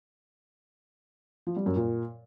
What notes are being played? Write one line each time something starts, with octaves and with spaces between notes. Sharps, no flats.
F3
G3
F#2
A#2